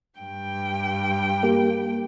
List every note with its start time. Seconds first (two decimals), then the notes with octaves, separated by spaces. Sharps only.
0.19 G2 G5
1.43 A#3 G4